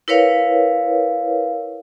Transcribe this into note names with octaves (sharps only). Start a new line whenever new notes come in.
E4 A#4 B4 C#5 F5